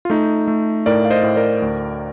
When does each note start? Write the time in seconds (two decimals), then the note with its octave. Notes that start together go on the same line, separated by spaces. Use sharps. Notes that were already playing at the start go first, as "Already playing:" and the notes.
0.05 F4
0.10 A3 D#4
0.48 A3
0.86 A2 A#4 D5
1.05 F5
1.10 C5 D#5
1.23 A2
1.36 A#4 D5
1.62 D2